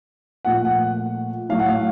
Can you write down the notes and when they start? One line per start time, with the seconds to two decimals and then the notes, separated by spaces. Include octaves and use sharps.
0.45 A#2 F3 A3 F#5
0.65 F#5
1.49 A2 F#3 A3 F5
1.59 F#5
1.69 F5